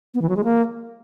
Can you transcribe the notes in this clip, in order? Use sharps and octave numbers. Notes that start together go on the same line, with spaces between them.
B3
E3
F#3
G#3
A#3